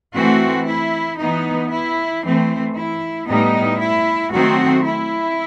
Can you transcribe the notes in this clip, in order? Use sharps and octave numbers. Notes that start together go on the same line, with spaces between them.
E3 A3 C4 F#4
E4
E3 B3 D#4
E4
E3 A3 C4
E4
A2 G3 B3 D#4
E4
D#3 F#3 A3 C4 F#4
E4